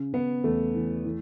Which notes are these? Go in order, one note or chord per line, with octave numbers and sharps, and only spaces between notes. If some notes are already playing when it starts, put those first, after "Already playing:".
Already playing: C#3
C#3 B3
E2 A3
E3
E3